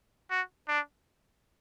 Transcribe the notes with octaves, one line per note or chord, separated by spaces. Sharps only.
F#4
D4